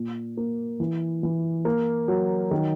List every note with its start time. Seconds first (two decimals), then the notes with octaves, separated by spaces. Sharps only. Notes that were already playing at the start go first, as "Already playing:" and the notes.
Already playing: A#2
0.37 A#3
0.80 E3
1.23 E3
1.65 A#3
2.08 F#3
2.51 D#3